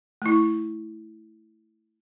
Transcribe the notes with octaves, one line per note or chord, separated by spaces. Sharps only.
A3 E4